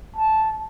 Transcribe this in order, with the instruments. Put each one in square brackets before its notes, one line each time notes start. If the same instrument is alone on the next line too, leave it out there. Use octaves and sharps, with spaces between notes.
[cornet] A5